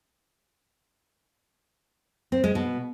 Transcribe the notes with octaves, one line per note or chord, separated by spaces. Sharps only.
C4
G#3
B2